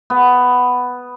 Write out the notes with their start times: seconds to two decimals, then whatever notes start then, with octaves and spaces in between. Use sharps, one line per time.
0.10 B3